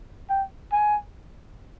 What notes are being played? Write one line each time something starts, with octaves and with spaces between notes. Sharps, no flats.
G5
G#5